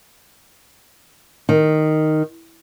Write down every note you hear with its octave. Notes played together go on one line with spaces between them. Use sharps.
D#3